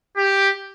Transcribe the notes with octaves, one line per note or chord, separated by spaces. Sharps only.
G4